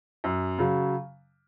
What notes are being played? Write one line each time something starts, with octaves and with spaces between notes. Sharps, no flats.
F#2
C#3 F#3